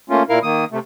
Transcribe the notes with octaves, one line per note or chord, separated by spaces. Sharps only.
A3 A#3 C#4 F4
A#2 E4 A#4 F5 F6
D#3 A#3 D#6
C3 A3